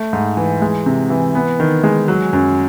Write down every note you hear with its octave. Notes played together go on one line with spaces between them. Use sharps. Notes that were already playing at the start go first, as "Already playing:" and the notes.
Already playing: A3
G#2
E3
G#3
C3
E3
B3
D#3
G#3
F#3
F#2